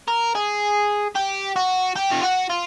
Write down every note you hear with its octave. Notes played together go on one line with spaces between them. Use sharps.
A#4
G#4
G4
F#4
G4
F4
F#4
F4